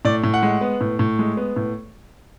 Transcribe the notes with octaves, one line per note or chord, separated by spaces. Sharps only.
A2 D5
A2
F#5
G#3
B3
A2
A2
G#3
B3
A2